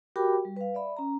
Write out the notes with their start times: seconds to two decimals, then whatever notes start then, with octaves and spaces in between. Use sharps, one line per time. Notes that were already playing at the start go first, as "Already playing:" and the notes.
0.16 F#4 G4 A#4 G5 B5 D6
0.45 G3
0.56 B4 F5
0.74 D5 E5 B5
0.97 C#4 A#5